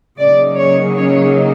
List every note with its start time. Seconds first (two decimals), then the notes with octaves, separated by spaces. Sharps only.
0.19 C#3 F#3 A#3 D#4 D5
0.57 C#5
0.96 C#5